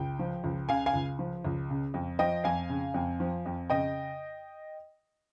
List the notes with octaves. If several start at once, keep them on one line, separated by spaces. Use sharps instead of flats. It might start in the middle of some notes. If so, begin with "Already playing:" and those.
Already playing: C#2 G5
F3
C#2
C#3 F5 G#5
F5 G#5
C#2
F3
C#2
C#3
F2
F3 D#5 G5
F2 F5 G#5
C#3
F2
F3
F2
C#3 D#5 G5